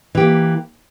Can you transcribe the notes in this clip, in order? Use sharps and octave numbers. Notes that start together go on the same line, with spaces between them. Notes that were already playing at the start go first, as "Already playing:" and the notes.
E3 A#3 G4